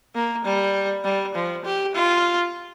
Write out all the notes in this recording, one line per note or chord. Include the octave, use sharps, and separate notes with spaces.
A#3
G3
G3
F3
G4
F4